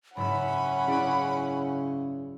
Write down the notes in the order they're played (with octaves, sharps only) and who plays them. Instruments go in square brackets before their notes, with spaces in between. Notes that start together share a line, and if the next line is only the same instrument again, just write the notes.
[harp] F#1 G#2 E5 [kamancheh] C#4 F#5 [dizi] B5
[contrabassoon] C#3 [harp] E4 D5